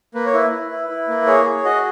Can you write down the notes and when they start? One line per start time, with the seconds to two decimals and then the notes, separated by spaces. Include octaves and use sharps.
0.14 A#3 B4
0.26 C#5
0.34 E4 B4
0.52 E4
0.71 E4
0.89 E4
1.08 A#3
1.27 G#4 C#5
1.45 G#4
1.64 F#4 D#5